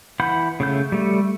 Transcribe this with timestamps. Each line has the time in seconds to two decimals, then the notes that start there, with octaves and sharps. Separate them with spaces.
0.20 E3 F#5 B5 G6
0.60 C#3 A3 G6
0.92 G3 A3